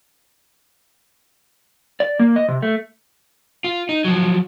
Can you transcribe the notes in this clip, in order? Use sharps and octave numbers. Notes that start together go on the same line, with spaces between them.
D5
A#3
D#5
C3
A3
F4
D#4
F3 F#3